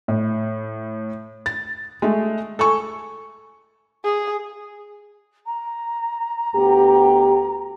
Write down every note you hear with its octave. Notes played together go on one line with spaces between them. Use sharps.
A2
A6
G#3 A3
A4 G#5 C#6
G#4
A#5
D2 B3 G4